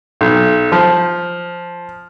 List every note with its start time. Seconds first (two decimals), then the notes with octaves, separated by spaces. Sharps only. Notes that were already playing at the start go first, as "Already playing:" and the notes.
0.21 B1
0.72 F3